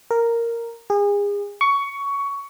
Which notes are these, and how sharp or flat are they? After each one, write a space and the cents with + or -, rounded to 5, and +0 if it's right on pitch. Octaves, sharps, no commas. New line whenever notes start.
A#4 -5
G#4 -35
C#6 +15